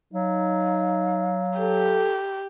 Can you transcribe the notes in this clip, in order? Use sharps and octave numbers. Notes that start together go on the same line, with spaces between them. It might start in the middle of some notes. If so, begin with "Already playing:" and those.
F#3 D#4 F5
G4 A4